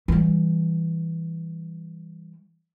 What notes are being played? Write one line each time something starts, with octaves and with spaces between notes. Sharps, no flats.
E3 G3